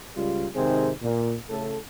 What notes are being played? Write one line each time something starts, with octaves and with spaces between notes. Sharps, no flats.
C#2 G3 F4
G#2 C3 D#3 C4 G#4 C5
A#2
A2 C#3 A4